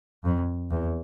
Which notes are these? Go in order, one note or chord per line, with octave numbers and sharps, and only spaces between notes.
F2
E2